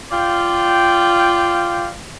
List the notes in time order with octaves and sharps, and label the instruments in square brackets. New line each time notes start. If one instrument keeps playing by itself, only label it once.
[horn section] F4 D5 F5 G5